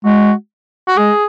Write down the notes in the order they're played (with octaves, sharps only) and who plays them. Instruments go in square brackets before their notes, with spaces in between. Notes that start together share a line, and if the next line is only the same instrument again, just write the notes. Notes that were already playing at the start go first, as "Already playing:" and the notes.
[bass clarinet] G#3 [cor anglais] F#4
[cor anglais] F#4
[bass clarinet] G#3 [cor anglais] G#4